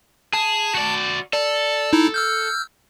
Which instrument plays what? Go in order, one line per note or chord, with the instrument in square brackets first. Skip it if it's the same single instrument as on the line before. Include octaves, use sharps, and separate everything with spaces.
[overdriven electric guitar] G#4 [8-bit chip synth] A5
[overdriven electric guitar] F#4 D5
[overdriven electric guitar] A4 [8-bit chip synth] D5
[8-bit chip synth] D#4 E4
E6 F6 G6